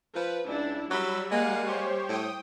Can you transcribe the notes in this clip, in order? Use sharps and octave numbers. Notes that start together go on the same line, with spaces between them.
F3 B4
C#2 D4 E4
F#3 G3 B5 E6
G#3 A#3 F5 F#5
G4 C5 C#5
A2 G5 D#6